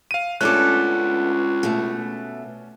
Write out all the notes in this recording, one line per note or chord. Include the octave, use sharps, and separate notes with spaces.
F5 D#7
C#2 A3 B3 C#4 D4 A4 D6 F#6
B2 A3